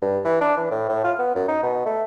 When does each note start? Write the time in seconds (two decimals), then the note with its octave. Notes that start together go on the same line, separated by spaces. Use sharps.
0.02 G2
0.24 E3
0.41 D4
0.57 E3
0.71 A2
0.89 A2
1.04 F4
1.19 B3
1.35 F#2
1.48 D#4
1.63 B2
1.86 A3